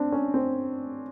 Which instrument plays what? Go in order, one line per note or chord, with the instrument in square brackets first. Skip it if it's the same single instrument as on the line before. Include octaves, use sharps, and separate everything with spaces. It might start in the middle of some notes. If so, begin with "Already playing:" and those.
Already playing: [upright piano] C4 D4
C#4
C4